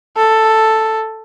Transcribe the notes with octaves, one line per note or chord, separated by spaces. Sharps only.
A4